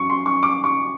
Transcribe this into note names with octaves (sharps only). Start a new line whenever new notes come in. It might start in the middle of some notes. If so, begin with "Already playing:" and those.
Already playing: F#2 C#6
C6
C#6
D6
C#6